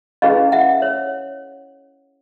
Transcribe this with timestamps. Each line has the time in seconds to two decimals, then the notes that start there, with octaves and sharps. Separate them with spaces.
0.22 C#4 E4 G#4 B4 D#5 F5
0.52 E5 F#5
0.82 C#5